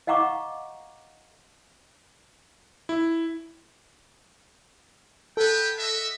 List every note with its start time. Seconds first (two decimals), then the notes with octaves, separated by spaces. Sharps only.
0.07 D#5 F5 F#5 A#5 C#6 D6
2.89 E4
5.37 B3 A4 B4 G5
5.78 F#4 D#5 E5